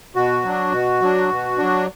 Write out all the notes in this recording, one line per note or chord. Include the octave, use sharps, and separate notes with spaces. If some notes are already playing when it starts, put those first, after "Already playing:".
B2 F#4
F#3 D4
B2
F#3 D4
B2
F#3 D4